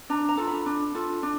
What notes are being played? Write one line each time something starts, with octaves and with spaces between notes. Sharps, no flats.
D4 A#5
A#5
F4 A4
B5
D4
F4 A4
D4